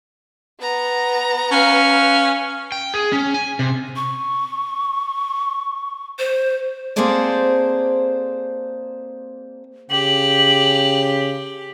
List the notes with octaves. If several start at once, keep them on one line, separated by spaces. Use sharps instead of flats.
B3 A#5
C#4 B4 F5
G5
G#4
C#4
G#5
C3
C#6
C5
A#3 C4 G#4 A4 C5 D5
C#3 G4 F#7